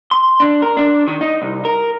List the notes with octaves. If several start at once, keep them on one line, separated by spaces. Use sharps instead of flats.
C6
D4
A#4
D4
D#3
D#4
C2
A#4